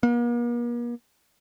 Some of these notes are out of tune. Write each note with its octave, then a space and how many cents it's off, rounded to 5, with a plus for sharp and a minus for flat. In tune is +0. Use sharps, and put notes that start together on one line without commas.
A#3 +45